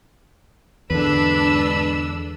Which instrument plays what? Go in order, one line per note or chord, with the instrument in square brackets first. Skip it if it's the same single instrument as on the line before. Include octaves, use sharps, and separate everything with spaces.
[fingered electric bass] E2 D3 [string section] G#2 D4 E6 [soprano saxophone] B4